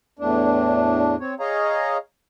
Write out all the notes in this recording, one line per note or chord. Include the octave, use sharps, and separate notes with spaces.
E2 A2 D4
C4 C#5
G#4 C#5 D#5 F5 A#5